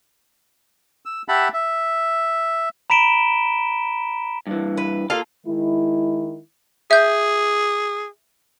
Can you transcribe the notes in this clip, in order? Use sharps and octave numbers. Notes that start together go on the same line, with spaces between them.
E6
G4 E5 F#5 A5 B5
E5
A#5 B5 B6 D7 E7 G7
G2 E3
B4
A#3 F4 A4 F5
D#3 G#3 E4
G#4 E5 G6